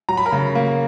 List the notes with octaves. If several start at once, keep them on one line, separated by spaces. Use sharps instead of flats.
F#3 A#5
B5
A#4 A#5
C#3
A#3